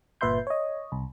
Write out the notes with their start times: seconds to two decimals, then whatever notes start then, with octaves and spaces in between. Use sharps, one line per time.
0.21 G1 A#2 B4 E5 C6 G6
0.47 C#5 D#5
0.92 C2